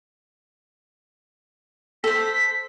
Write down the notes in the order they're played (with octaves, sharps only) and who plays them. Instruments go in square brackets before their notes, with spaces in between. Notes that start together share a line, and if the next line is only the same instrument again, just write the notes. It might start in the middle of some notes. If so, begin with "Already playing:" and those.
[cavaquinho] A4 C5 [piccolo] B6